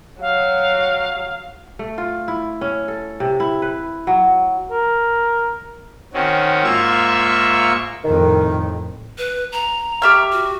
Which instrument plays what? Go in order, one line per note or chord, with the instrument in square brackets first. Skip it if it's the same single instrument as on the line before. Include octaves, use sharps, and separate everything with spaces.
[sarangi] F#3 [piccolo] F5
[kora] A3
F4
E4
C#4
A4
C3
E4
B4
F#3
[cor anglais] A#4
[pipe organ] D#3 C4 C#4 F#4
G#2 A#3 F4 E5 C#6 E6
[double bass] F2 A2 [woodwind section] D#3
[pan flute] B4
A#5
[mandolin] G4 E5 F6
[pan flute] F#4